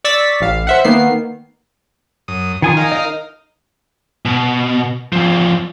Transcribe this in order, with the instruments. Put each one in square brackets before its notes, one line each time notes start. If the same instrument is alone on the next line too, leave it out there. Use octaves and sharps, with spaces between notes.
[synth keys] D5 C#6 E6 A6 B6
A1 F5
C5 E5 F#5
D#3 A#3 B3 C7
[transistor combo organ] F#2 D#6
[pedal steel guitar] D#3 G#5 D#6 [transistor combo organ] F3
[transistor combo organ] D#4 A#4 F5
[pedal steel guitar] D#5
[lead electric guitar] B2
E2 F3